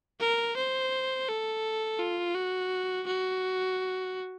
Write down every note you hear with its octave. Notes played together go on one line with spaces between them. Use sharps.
A#4
C5
A4
F4
F#4
F#4